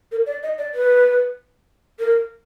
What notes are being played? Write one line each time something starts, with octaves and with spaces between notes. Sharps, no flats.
A#4
D5
D#5
D5
B4
A#4